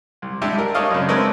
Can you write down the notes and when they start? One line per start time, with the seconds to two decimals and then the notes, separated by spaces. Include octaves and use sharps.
0.22 C2
0.42 G3 G#3 D4 G4 E5
0.58 A#4
0.74 A3 D4 C#5 D#5 F5
0.91 F#2 C#3
1.09 G#3 A3 C4 D4 A#4 B4